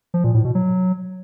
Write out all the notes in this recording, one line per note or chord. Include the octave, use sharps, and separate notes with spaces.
F3
A#2
A2
B2
F#3